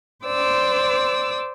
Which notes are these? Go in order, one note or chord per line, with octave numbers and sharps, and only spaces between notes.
C5 D5 D6 E6